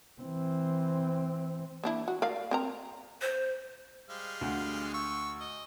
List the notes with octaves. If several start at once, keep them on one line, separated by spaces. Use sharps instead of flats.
E3 C4
A#3 D4 E4
F#4
A#4 D5 F5
C4 A#4 A#5
C5
G3 G#3 F5
D2
C#6 E6
D#5